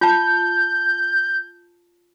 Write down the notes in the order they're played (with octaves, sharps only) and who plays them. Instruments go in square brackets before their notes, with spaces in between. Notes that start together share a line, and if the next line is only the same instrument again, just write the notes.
[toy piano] F4 A5 [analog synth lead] G6